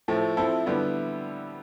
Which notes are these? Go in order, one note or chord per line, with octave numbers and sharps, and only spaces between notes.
A2 F3 A3
F3 C4 E4 A4
D3 G3 B3 E4